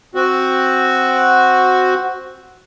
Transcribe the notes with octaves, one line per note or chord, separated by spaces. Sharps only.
C4 F#4